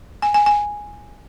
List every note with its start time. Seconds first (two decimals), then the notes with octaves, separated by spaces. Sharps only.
0.22 G#5
0.34 G#5
0.46 G#5